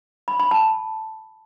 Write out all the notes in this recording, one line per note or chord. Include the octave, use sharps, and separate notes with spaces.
B5
B5
A5